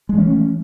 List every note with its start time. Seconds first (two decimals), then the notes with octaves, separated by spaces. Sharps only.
0.09 G#3
0.14 E3
0.18 C#4
0.23 A3